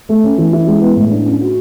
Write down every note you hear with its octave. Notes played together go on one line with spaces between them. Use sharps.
A3
C#4
E3
E4
G#3
B3
A2
D4
C#4
F#4